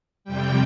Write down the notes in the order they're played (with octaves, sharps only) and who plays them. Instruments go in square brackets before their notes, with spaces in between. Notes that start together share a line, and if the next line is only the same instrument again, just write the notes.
[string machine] F2 C3 G3 G5